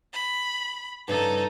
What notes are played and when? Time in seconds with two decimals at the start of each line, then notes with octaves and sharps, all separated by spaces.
0.13 B5
1.08 G2 C#3 F3 D#4 A4